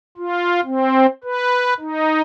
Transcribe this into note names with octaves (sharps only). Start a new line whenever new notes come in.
F4
C4
B4
D#4